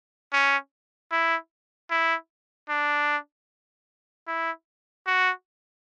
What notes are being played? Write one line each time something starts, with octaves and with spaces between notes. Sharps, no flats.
C#4
E4
E4
D4
E4
F#4